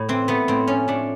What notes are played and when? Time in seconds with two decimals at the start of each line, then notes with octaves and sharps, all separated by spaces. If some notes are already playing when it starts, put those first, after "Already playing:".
Already playing: A2
0.09 E3 C4
0.28 A3 B3
0.48 A2 C4
0.67 F3 C#4
0.88 A3 D4